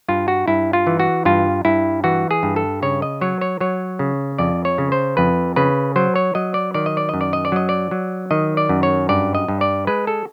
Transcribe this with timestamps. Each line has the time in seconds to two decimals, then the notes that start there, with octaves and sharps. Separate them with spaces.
0.08 G2 F4
0.28 F#4
0.48 G2 E4
0.73 F4
0.87 E3
1.00 F#4
1.25 G2 F4
1.65 G2 E4
2.04 E3 F#4
2.31 G#4
2.43 G2
2.56 A4
2.82 C#3 C#5
3.02 D#5
3.21 F#3 C#5
3.41 C#5
3.60 F#3 C#5
3.99 C#3
4.39 F2 D5
4.65 C#5
4.78 C#3
4.92 C5
5.17 F2 B4
5.56 C#3 B4
5.96 F#3 C5
6.16 C#5
6.35 F#3 D#5
6.54 D5
6.74 D#3 D5
6.86 D#5
6.97 D5
7.09 F#2 D#5
7.21 D5
7.33 D#5
7.45 D5
7.52 F#3 D#5
7.69 D5
7.91 F#3
8.31 D#3 D#5
8.57 D5
8.69 F#2
8.83 C#5
9.09 G2 D5
9.35 D#5
9.48 G2
9.61 D5
9.87 G#3 B4
10.07 A4